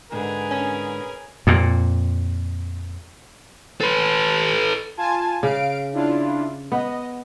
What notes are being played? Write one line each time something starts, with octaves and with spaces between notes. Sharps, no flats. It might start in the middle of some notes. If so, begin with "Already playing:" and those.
G#2 D3 C4 G#4 A#4 B4
C#4
F2 A#2
A4 B4
F4 G#5 A5
C#3 F5 D7
D4 E4 F4
B3 D#5